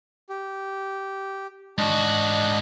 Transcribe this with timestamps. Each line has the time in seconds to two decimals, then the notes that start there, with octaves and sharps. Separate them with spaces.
0.29 G4
1.78 G#2 D4 F#4 D#5 F#6